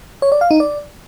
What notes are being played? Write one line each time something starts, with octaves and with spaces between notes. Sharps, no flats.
C#5
D5
F5
D#4
D5